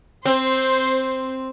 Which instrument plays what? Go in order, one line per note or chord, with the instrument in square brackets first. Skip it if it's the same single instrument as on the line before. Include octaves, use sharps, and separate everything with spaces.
[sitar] C4 [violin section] C5